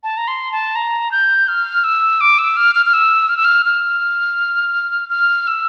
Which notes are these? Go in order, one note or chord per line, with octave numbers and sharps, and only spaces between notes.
A5
A#5
C6
A5
A#5
G6
F6
E6
D6
E6
F6
F6
F6
E6
F6
E6
F6
F6
F6
E6